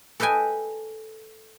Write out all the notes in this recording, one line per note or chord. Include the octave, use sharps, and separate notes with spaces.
A4 B4 D#5 G5 G#5